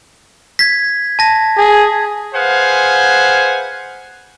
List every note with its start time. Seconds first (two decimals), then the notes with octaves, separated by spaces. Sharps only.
0.59 G#6 B6
1.19 A5 A#6
1.57 G#4
2.34 G#4 B4 C5 F5 F#5 G#5